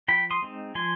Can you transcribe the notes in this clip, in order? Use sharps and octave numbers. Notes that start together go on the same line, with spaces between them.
F3 G5 B5
C6 D#6
G#3 C4 D#4
F3 G#5 C6